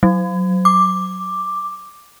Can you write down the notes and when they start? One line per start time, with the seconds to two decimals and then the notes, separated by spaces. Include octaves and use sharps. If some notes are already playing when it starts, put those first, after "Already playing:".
0.03 F#3
0.65 D6